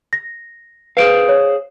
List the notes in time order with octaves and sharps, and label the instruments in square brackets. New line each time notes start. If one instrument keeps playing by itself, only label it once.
[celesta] A#6
[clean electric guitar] G#4 C5 F5 [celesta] B4 D7
[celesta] C#5